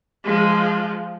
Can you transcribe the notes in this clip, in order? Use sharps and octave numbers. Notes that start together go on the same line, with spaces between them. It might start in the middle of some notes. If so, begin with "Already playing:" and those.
F3 G#3